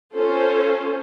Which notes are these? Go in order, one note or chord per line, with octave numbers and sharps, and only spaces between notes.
C#4 F4 A4 C5